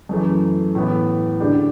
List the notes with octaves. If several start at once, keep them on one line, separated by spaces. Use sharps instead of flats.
F#2 E3 A3
A2 E3 B3
D3 A3 D4 G4